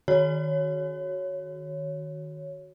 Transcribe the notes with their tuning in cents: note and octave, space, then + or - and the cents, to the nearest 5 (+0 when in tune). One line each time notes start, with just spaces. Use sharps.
D#3 -10 F#4 +0 C#5 +0